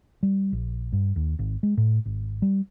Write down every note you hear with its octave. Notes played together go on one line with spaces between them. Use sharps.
G3
A#1
G2
D#2
G#1
G#3
A2
G#1
G3